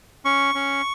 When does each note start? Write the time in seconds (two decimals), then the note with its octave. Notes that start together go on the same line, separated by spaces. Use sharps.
0.25 C#4 C#6
0.55 C#4